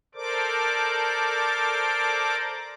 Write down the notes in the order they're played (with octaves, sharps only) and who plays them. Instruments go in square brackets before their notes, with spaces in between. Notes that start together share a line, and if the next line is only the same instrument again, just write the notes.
[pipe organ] A4 A#4 C5 D5 D6